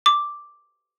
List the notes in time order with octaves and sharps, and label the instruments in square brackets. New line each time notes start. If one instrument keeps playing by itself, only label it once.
[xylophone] D6